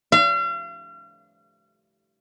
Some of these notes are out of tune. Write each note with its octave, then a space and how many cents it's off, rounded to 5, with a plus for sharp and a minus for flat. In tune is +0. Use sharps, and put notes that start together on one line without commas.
F5 -40